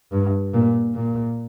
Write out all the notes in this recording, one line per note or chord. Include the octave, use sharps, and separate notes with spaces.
G2
A#2
A#2